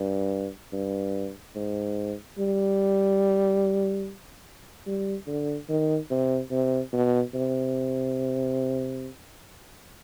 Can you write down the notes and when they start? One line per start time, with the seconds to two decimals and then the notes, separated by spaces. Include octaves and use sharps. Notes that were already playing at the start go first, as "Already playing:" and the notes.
Already playing: G2
0.73 G2
1.56 G#2
2.38 G3
4.87 G3
5.27 D3
5.69 D#3
6.11 C3
6.51 C3
6.93 B2
7.34 C3